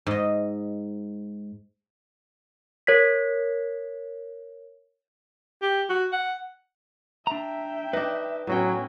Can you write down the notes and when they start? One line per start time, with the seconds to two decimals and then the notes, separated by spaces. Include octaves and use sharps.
0.06 G#2 D#5
2.87 A#4 C#5 G#6 B6
5.62 G4
5.90 F#4
6.12 F#5
7.27 D4 E5 G5 A#5
7.93 D4 D#4 B4
8.47 A2 F#3 B3 C#4 F#4 G5